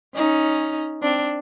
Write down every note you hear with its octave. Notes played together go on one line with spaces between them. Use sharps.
C#4 D#4
C4 D4